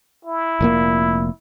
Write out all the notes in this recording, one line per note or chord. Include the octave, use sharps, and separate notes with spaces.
E4
F1 A#2 A#3